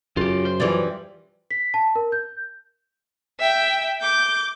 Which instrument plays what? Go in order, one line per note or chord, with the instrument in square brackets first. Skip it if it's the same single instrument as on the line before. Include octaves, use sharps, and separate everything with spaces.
[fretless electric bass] F#2 [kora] C#3 [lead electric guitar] F4 G4
[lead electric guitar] C5
[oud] E3 G3 [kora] F3 G#4 D5
[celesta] B6
A5
A#4
G6
[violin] E5 G5
D6 G6